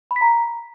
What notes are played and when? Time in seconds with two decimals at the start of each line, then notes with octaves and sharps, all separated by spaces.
0.11 B5
0.16 B6
0.21 A#5